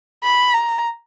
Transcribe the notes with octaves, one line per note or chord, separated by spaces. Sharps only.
B5
A#5